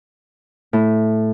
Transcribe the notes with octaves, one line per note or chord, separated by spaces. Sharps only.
A2